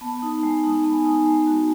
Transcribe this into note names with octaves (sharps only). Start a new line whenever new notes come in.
B3 A5
D#4
G#3
D#4
B3 G#5
D#4
G#3
F#4